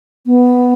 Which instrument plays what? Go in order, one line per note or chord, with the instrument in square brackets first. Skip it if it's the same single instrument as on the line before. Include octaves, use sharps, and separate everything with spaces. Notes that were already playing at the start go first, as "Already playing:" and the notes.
[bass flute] B3